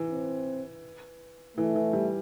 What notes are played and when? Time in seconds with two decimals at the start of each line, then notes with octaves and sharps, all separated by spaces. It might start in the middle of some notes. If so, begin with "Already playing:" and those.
Already playing: E3
0.11 C4
1.57 E3 A3
1.76 E3
1.93 G3